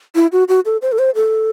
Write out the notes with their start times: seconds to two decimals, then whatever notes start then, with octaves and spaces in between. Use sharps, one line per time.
0.15 E4
0.32 F#4
0.49 F#4
0.65 A4
0.82 C5
0.92 A4
0.99 C5
1.15 A4